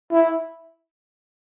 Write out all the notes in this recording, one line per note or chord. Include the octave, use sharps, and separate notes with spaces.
E4